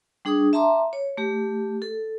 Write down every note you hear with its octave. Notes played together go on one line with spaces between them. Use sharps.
G3 D4 G#4 C#6 D#6
E5 A5 A#5 C6 D6
C#5
A3 G4
A4